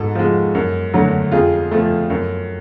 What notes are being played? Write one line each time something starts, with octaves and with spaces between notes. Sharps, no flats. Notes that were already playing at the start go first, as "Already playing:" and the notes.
Already playing: G#2 F#4 A4
F3 G#3
F#2
D3 F#3 A3
F2 F4 G#4
F3 A3
F#2